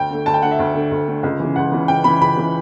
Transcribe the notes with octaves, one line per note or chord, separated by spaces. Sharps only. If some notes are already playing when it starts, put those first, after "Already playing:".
Already playing: D2 G5
D3 A3
D2 A5
G5
D3 A3 F#5
E5
D2
D3 A3
D2
D3 A3
C#2
C#3 E3
C#2 F#5
C#3 E3
C#2 G5
C#3 E3 B5
C#2 B5
C#3 E3